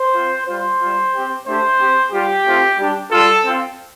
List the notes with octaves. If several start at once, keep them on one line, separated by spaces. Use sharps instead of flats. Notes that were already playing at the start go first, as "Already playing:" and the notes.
Already playing: C5
C4 F4
G3 F4 C5
G3 F4
C4 G4
A3 D4 G4 C5
C4 G4
G3 F4 G4
A3 C4 F4
G3 D4 G4
G3 F4 A4
C4 F4